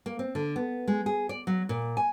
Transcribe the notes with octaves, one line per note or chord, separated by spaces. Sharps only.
A#3
C4
D3
B3
G#3
G#4
D5
F#3
A#2
G#5